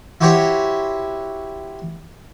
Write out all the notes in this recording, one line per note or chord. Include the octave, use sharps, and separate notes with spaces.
E4 F#4 G4 C5 C#5